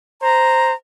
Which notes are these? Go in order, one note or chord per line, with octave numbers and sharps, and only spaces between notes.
C5 A#5